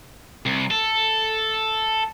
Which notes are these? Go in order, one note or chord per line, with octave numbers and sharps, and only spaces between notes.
C2
A4